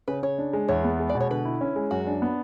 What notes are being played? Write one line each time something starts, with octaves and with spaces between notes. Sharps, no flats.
C#3 B4
C#3 C#5
D4
G#3
E2 C#5
B3
G#3
D5
B2
C#5
D3 B4
E4
C#4
G#3
F#2 F#4
D4
B3